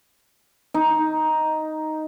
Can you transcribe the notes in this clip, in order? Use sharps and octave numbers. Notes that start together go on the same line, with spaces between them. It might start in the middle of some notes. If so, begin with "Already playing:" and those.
D#4